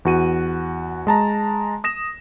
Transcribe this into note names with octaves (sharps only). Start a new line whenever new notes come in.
E2 F#4 D#7
G#3 A5 A#5
D#6 A#6 E7